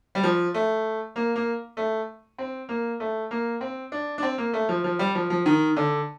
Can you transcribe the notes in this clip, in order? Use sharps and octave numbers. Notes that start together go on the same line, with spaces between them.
G3
F3
A3
A#3
A#3
A3
C4
A#3
A3
A#3
C4
D4
D4
C4
A#3
A3
F3
F3
G3
F3
F3
D#3
D3